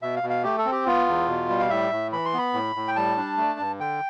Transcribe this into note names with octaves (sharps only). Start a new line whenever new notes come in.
B2 E5
F5
B2
F5
A3 G4
A4
C4
G4
B3 F4
E2
B2
G3
F5
A2 E5
A2
E3 B5
C6
B3 B5
A2
A2
G5
G3 A5
D4
A3
G2
D3 G5